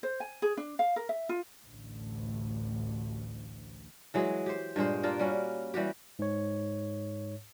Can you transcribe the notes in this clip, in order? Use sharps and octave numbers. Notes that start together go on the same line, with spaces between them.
C5
G#5
G#4
D4
F5
A#4
E5
F4
A1 D2
E3 F#3 G#3 G#4
G4 C5
G2 A#2 G#3 C5
A#3 D4 F4 A#4
G3 C#4 F#4
E3 G3 F#4 G4
G#2 C#5